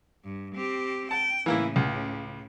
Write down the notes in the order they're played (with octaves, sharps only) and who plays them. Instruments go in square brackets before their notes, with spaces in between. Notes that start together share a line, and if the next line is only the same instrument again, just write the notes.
[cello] G2
C4 G4
[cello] G5 [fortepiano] A5
[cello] A2 C#3 [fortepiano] E3 A#3 E4
[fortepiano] C#2